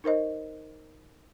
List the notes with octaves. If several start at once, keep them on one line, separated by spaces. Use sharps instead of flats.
D#4 A#4 C5 D#5